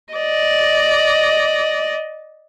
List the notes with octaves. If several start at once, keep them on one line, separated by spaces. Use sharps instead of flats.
D5 D#5